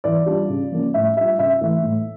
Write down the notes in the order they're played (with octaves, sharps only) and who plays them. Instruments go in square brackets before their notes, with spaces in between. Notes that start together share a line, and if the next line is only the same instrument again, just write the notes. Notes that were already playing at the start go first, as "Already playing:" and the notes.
[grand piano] E3 D5
G3 D4 F4
C#3
F3 A#3 C#4
A2 E5
G3 D4 F4 E5
C#3 E5
E3 A3
A2